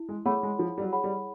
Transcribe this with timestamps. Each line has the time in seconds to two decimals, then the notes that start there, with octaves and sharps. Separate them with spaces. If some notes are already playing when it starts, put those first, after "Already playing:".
Already playing: E4
0.09 G#3
0.25 A3 G#4 C#5 F#5 B5
0.43 G#3
0.59 F3 E4
0.78 G3
0.81 F#3
0.93 G#4 C#5 F#5 B5
1.04 G3